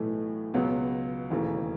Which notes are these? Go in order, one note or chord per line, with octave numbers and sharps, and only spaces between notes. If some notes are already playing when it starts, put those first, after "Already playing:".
Already playing: B1 A2 E3 A3
C#2 B2 F#3 B3
E1 D#2 C#3 E3 A3